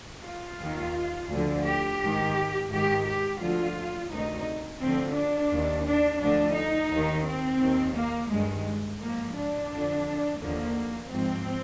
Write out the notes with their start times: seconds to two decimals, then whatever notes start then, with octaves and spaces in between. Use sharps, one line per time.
0.25 F4
0.59 D#2 D#3
1.31 D2 D3 F3
1.65 G4
2.00 G#2 D#3
2.70 G#2 D#3 G4
3.05 G4
3.40 D2 D3 F3 F4
4.10 D2 C3 D#3 D#4
4.81 D2 D3 F3 C4
5.15 D4
5.51 D#2 D#3
5.86 D4
6.21 D2 D3 F3 D4
6.56 D#4
6.91 D#2 D#3
7.25 C4
7.62 D#2 D#3
7.96 A#3
8.31 G2 D#3 G#3
9.01 G#2 F3 A#3
9.36 D4
9.72 F2 D3 F3
10.41 D#2 D3 F3 A#3
11.12 G#2 F3 C4